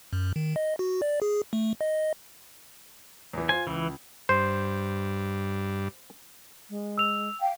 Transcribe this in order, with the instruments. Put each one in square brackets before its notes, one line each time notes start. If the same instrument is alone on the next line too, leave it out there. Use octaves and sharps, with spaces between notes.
[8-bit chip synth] F#2
D#3
D#5
F#4
D5
G#4
A3
D#5
[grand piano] E2 E3
[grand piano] F4 C5 [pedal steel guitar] G#5
[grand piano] C#2 [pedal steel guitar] E3
[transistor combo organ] G2 [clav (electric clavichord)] C5
[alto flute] G#3
[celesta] E6 F7
[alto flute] F5 [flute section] G5